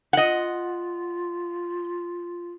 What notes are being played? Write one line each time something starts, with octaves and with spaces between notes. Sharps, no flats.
F4 D#5 F#5